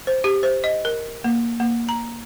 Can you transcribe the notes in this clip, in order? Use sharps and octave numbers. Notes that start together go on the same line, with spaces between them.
C5
G4
C5
D#5
A#4
A#3
A#3
A#5